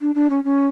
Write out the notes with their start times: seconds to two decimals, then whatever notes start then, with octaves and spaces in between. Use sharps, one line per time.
0.01 D4
0.15 D4
0.30 C#4
0.44 C#4